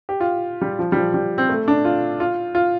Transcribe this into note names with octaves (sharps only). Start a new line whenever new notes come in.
G4
F4
G3
F3
G3
F3
G3
C4
A3
D4
F4
F4
F4